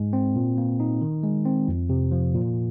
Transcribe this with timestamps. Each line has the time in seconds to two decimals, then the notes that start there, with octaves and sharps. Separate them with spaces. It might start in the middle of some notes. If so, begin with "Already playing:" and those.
Already playing: G#2 G#3
0.13 C4
0.36 A#2
0.58 A#3
0.80 D#4
1.01 D#3
1.23 G#3
1.45 C4
1.68 F2
1.89 C3
2.11 F3
2.35 A#2